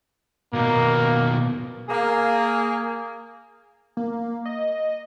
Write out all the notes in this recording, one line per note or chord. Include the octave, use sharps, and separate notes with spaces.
B2 D#3 A#3
A#3 G#4
A#3
D#5